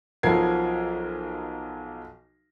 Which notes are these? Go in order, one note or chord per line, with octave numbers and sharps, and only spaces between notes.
B1 F3 F#3 A#4 G#6 C7